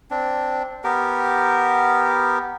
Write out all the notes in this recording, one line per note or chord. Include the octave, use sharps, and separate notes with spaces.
C4 D4
B3 G4 A#4